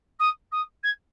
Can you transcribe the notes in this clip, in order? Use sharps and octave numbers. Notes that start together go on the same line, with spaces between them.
D#6
D#6
G#6